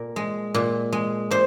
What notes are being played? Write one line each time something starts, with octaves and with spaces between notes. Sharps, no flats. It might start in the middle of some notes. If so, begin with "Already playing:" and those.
Already playing: A#2 A#4
G#3
A#2
G#3
A#2 C5